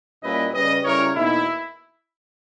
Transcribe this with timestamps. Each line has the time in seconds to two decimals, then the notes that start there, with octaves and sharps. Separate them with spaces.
0.23 A#2 G3 A#3 C#4 E4 B4 D#5
0.54 C#3 G3 C#4 B4 D#5
0.84 C#3 G3 C#4 E4 A#4 C#5
1.15 E2 B2 A#3 D#4 E4